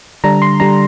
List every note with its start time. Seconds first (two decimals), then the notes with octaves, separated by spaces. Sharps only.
0.24 D3 G3 D4 A#5
0.42 C6
0.60 D3 G3 D4 A#5